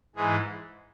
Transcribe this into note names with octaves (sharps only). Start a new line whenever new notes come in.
G#2 E3 G#3 G#4